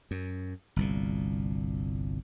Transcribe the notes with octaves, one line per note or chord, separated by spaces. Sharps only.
F#2
G1 C2 A#2